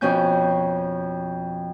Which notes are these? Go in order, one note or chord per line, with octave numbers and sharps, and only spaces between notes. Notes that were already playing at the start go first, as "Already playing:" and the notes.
F2 B2 C#4 G6